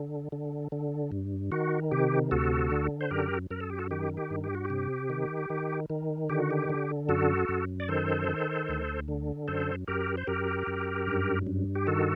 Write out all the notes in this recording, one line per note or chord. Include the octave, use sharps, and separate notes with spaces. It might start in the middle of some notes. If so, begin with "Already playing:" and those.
Already playing: D3
D3
D3
G2
D#3 F#4
C3 G4
D2 F#4 A4
D3
C5
F#2 G4 A#4
F#2 A#4
A4
G4
F#4 A4
D#3 G4
G4
G2
G4
F#4
G4
C3
D#3
D#3
D#3
D3 G4
F#4
G4
D3
F#2 F#4 A4
F#2
D5
D#3 A4 C5
D#3
D2
D3
F#2 A4 C5
F#2 G4 A#4
C5
F#2 G4 A#4
F#2
G2
G2
G4
D#3 F#4 A4